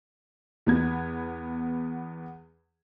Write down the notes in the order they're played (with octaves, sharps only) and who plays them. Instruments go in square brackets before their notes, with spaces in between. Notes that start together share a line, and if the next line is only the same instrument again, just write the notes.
[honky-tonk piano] E2 B3 G#6